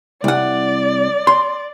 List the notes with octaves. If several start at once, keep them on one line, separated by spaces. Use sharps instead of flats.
C2 D5 F#5
C6